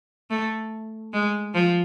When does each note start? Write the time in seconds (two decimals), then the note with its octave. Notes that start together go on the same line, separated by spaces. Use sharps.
0.30 A3
1.13 G#3
1.54 F3